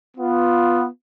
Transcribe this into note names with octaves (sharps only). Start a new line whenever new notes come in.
B3 F4